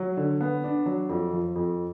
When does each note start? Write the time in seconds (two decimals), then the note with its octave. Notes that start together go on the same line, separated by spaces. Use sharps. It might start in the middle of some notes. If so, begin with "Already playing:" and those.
Already playing: F#3
0.17 D3
0.41 B3
0.64 D4
0.86 F#3
1.09 F2
1.32 F3
1.56 F2